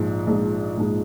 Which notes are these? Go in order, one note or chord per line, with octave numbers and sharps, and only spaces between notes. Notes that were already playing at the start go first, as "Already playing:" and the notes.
Already playing: A#1 G#2 F3 G#3
A#1 G#2 F3 G#3
A#1 G#2 F3 G#3